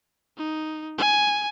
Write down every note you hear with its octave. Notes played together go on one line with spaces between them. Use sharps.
D#4
G#5